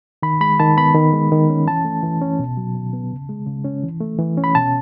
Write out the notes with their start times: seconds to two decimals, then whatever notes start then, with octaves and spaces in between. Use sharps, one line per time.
0.23 D#3 B5
0.41 G#3 B5
0.60 D#3 A5
0.77 B3 B5
0.95 D#3
1.13 G#3
1.32 D#3
1.50 C#4
1.66 E3 A5
1.85 A3
2.03 E3
2.22 C#4
2.39 B2
2.57 F#3
2.75 B2
2.93 B3
3.10 C#3
3.29 G#3
3.46 C#3
3.65 C#4
3.83 E3
4.01 A3
4.19 E3
4.37 C#4
4.44 B5
4.55 B2 A5